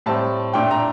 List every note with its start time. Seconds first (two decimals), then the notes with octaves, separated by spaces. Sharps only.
0.06 A2 G3 C4 A5
0.54 A#2 A3 D4 G5
0.71 A#5